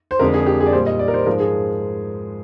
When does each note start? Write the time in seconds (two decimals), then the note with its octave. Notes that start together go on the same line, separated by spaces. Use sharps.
0.11 C5
0.19 F2 D3 G#3 A#4
0.34 G#4
0.46 G4
0.60 G#4
0.66 D5
0.73 A#2 G3 C5
0.86 D#5
0.99 D5
1.08 A#4
1.14 C5
1.26 G#2 F3 G#3 A#4
1.40 G#4